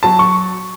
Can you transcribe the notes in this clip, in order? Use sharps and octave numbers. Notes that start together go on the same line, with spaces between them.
F#3 A5
C#6